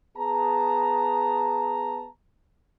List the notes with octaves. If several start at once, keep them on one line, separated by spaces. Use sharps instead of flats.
B3 G#4 A5 A#5